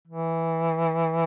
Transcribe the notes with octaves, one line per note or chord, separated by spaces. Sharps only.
E3